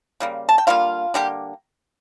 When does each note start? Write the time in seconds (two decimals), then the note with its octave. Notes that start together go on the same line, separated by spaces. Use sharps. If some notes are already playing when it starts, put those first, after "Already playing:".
0.20 C#3 G3 A#3
0.49 A5
0.58 G5
0.67 D3 G3 A#3 F4 F5
1.14 D3 G3 A#3 G4 G5